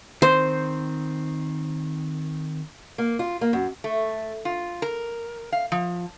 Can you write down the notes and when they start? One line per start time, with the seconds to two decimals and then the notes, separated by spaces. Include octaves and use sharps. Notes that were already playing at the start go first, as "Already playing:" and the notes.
0.22 D#3 C4 C5
2.98 A#3
3.19 F4
3.41 A#3
3.53 F#2
3.84 A3
4.45 F4
4.82 A#4
5.52 F5
5.72 F3